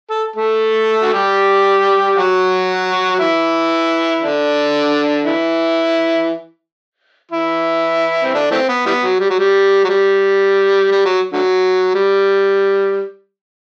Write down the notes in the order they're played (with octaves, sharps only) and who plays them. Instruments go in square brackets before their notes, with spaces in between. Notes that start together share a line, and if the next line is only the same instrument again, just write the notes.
[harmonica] A4
A3 A4
F#4
G3 G4
F#3 F#4
F#4
E3 E4
D3 D4
E3 E4
E3 E4
C4
D3 D4
E3 A3 C4
B3
E3 G3 B3
F#3
G3
F#3
G3
F#3
G3
G3
F#3
D3 F#3
G3